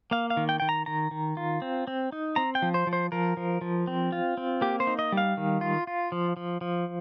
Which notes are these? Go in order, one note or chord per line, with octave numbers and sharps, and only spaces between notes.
A#3 F5
F5
D#3
G5
D#3 G5
A#5
D#3 A#5
D#3
F4
C4
C4
D#4
C4 A#5
G5
F3
C5
F3
C5
F3 A#4
F3
F3
C4
F4
C4
A#3 G4
C5
D#4
D#5
G3
F5
D#3
F4
F4
F3
F3
F3